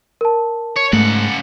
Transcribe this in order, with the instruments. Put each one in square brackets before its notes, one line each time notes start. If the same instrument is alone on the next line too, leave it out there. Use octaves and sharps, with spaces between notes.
[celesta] A#4 A5
[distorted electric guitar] C#5
[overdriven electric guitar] G#2 [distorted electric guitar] C#3 F#5 [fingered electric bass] A3